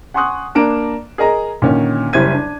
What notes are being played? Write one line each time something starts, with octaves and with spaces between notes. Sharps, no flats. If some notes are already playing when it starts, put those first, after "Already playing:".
F#5 G#5 C6 C#6 D#6 F#6
A#3 D4 A#5 D7 E7
G#4 A#4 D#5 A#5
A#2 D3 D#3 C#4
F#1 G3 E4 C5 G#6 D#7
D4